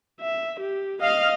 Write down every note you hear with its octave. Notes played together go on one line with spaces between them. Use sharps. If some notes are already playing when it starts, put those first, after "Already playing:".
E5
G4
D#5 F5 F6